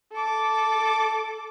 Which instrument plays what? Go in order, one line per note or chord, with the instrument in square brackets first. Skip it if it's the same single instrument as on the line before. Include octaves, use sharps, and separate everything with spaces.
[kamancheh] A4 D6